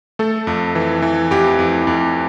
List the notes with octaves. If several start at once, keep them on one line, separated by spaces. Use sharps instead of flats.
A3 A4
F2
E3
E3
F2 G4
F2
F2